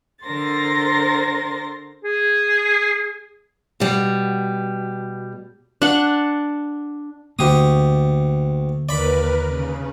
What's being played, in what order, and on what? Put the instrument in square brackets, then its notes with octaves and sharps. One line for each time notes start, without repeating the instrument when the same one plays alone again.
[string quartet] D3 A#4 C5 C6 A6 A#6
[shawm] G#4
[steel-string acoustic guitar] B2 G3
[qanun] D4 F#5
[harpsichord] D2 G4 D#6 [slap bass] D3 A#3
[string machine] D#2 A#4 B4 [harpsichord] D5 B5
[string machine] C#3